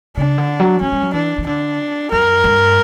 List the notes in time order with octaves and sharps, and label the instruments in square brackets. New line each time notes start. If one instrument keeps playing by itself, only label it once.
[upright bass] C#3 [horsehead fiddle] D4
[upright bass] D3
F#3
[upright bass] F#3 [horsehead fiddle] C#4
[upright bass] G3
F#3
[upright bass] E3 [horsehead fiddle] D4
[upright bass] E3
[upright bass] D3 [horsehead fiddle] D4
[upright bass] F#2 [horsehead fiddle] A#4
[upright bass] G2